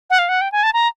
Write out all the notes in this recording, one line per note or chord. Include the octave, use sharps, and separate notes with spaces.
F#5
F5
F#5
G5
G#5
A5
A#5